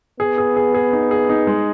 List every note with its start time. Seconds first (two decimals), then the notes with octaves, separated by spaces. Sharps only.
0.20 B3 G#4
0.38 G#4
0.57 G#4
0.74 G#4
0.93 D#4
1.11 G#4
1.29 D#4
1.47 G#3